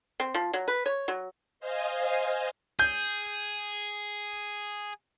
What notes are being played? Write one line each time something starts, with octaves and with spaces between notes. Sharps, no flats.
C4
F3
F#3
B4
C#5
F#3
C5 D#5 F5 G#5
G#4 G6